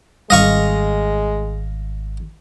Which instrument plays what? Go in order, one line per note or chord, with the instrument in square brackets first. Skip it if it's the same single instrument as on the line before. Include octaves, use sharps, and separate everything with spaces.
[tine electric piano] G#1 A#6 [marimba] G3 [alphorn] G#3 [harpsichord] D#5 F5 C#6